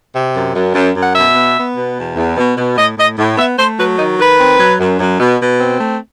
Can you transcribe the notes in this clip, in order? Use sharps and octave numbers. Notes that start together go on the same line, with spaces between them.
C3
F#2
F#2
F#2
F#2
F#5
B2 E5
B3
B3
B2
E2
E2
B2
B2
A2 D#5
A2 D#5
A2
B3 E5
A3 C5
F#3 B4
D#3 D#4
D#3 B4
C4
F#3
F#2
F#2
B2
B2
C4
A3